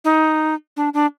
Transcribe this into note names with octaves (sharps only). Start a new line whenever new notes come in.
D#4
D4
D4